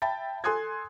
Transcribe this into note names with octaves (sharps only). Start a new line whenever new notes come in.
E5 G5 A5 B5 A6
A4 G#5 C6 D#6 F#6 G#6